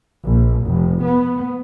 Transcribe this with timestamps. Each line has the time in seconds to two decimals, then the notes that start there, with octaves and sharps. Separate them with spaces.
0.25 A#1
0.64 F1
1.05 B3